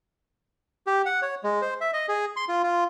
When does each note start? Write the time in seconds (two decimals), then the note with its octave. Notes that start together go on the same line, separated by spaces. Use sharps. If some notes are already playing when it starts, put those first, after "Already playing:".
0.87 G4
1.06 F#5
1.22 C#5
1.44 G#3
1.62 C5
1.81 E5
1.93 D#5
2.08 G#4
2.36 C6
2.48 F4
2.64 F4